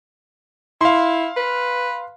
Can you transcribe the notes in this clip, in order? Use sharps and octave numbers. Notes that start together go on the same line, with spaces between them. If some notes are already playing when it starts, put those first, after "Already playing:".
E4 F5 C6
B4